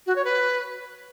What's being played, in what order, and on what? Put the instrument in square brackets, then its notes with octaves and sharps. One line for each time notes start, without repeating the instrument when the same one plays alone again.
[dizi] F#4
C#5
B4